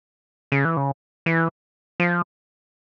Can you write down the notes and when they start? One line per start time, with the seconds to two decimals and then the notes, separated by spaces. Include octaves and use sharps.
0.52 C#3
0.65 E3
0.77 C#3
1.26 E3
2.00 F3